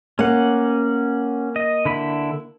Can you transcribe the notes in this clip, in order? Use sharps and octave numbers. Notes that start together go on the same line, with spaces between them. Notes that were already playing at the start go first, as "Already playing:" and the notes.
A#3 C#4 F#5
D#5
D3 E4 B5